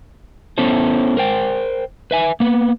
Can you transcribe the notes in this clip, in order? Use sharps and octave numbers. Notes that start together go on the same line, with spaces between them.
B3 C#4 E4 A4 C5
A#4 C5 G5
B4 E5 G#5
A#3 B3